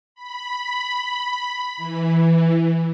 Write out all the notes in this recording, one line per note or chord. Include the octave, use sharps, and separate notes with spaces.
B5
E3